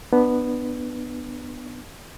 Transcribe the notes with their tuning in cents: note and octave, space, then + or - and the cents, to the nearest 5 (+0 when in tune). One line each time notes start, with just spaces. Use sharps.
B3 +0 D4 +25